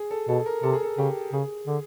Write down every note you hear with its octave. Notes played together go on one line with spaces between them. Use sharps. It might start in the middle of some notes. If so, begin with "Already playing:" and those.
Already playing: G#4
A4
B2 A4
A#4
C3 A4
G#4
A4
C#3 G4
C#3 G#4
D3